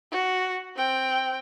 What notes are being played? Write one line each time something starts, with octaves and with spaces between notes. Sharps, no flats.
F#4
C4 G5